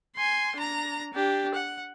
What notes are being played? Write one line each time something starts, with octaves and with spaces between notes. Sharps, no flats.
G#5 C6
D4 A#5
D4 G4
F#5